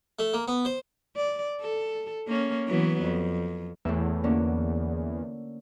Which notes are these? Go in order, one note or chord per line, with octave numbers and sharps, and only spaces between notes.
A3
A#3
B3
C5
D5
A4
A#3 C#4
E3 F#3 B3
F2
E2 A2 E4 E5
D3 A#3 C#4